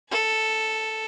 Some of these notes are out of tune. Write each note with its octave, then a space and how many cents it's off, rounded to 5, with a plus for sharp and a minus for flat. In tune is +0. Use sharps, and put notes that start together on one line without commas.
A4 +0 A5 -30